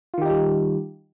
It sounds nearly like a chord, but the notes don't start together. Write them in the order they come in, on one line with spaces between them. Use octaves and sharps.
F4 D#3 G4 D#4 G3